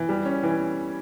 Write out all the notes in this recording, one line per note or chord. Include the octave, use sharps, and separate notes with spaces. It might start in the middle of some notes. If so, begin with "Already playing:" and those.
Already playing: E3
G3
C#4
E3